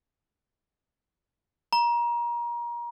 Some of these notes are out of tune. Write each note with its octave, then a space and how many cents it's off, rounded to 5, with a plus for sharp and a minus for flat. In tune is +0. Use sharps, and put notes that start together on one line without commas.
A#5 +30